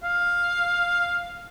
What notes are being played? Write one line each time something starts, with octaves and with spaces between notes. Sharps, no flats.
F5